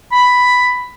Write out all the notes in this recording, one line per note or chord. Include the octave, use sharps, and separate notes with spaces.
B5